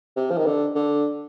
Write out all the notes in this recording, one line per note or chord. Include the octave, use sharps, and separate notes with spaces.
C3
F3
D#3
D3
D3